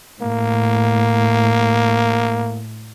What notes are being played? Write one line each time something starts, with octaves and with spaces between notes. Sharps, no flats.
A2 A#3